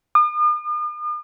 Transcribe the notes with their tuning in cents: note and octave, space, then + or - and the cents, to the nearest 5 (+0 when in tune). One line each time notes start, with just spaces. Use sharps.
D#6 -45